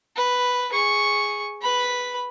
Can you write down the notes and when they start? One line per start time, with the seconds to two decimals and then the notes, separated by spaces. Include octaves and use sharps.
0.16 B4
0.73 G#4 C#6
1.62 B4 B5